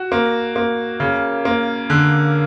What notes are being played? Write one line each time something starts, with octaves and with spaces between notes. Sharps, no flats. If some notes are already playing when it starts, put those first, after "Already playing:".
Already playing: F#4
A#3
A#3
C#3
A#3
D3